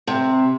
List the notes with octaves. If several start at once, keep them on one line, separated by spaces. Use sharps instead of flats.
C3